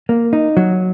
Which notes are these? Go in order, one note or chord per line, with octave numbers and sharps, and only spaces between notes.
A#3
D#4
F#3